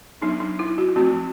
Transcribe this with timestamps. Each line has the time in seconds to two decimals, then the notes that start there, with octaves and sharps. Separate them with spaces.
0.22 F#3 B3 D4 D#4
0.40 D#4
0.59 E4
0.78 F#4
0.96 F3 A3 C4 F#4